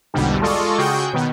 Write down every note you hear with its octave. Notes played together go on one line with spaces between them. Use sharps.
B1 E2 G#2 B2 D3 G3
G#3 F4 A4 D5 D#5 C#6
C#3 F#4 G#4 G5 C#6 G6
B2 D#3 B3